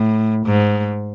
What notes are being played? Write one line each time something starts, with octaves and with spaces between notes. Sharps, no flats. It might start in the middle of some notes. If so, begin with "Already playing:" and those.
Already playing: A2
G#2